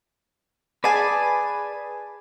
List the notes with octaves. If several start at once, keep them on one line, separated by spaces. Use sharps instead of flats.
G#4 B4 D5 G#5 A5